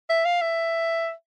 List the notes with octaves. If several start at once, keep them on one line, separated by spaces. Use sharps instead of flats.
E5
F5
E5